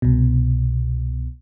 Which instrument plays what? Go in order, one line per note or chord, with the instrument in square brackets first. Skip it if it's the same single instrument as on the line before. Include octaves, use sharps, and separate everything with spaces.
[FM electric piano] C2 B2